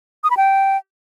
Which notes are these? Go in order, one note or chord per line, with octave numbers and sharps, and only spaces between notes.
D#6
B5
G5